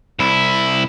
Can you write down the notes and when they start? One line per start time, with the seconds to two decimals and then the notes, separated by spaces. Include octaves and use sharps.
0.19 C2 E4